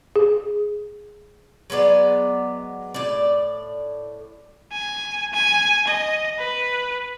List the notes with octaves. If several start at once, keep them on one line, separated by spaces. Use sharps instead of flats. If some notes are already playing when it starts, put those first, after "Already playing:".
G#4
F#3 G#3 B3 D5
A2 D5
G#5
G#5
D#5
B4